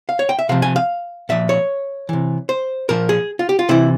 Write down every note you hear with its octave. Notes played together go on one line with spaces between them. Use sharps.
F5
C#5
G5
E5
C3 F3 F5
G#5
F5
A#2 F3 E5
C#5
C3 E3
C5
A#2 F3 A#4
G#4
F4
G4
F4
C3 E3 E4